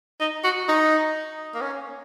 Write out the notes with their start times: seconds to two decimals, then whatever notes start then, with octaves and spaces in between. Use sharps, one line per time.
0.20 D#4
0.44 F#4
0.69 D#4
1.54 A#3
1.61 C#4